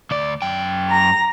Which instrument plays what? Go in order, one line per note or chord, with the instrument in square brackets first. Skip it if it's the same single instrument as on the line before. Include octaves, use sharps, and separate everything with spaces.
[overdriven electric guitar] D2 D5
F#2 G5
[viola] A#5